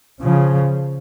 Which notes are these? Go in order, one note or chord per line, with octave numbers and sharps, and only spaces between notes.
C#3 F3